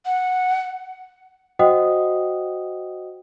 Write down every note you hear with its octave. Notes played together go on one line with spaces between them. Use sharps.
F#5
F#4 C5 D#5 F#5 G5 D#6